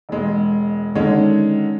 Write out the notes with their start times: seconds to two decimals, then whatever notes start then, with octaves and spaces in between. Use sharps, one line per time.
0.09 E1 G#3
0.95 D3 D#3 G#3 C#4